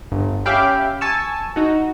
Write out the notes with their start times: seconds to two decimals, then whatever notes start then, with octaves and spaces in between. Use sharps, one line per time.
0.12 G1
0.45 C#4 G4 E5 F5 G5 B5
1.01 G#5 A5 C#6 E6
1.56 D#4 F#4